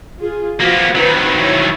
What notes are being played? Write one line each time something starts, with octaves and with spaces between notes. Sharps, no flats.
F4 G#4
F3 A#3 B3 F4 F#4
D#3 F#3 C4 B4
E4 C#5 E5